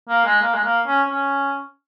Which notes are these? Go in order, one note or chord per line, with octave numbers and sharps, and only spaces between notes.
A#3
G#3
A#3
G#3
A#3
C#4
C#4